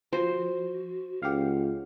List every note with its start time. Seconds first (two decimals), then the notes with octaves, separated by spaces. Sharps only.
0.13 F3 F#4 C5
1.23 C#2 G4 F5 F#5